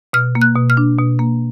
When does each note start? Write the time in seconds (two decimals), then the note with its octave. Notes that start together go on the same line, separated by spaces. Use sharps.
0.13 B2 F6
0.35 A#3
0.42 F#6
0.55 B2
0.70 F6
0.77 D4
0.99 B2
1.19 A#3